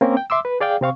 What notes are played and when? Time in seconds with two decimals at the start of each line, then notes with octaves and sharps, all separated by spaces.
0.01 A#3 C4 C#4 A#4
0.17 G5
0.30 E5 C6 D6 E6
0.45 B4
0.61 G#4 D5 F5 G5
0.81 C3 C4 F5 C#6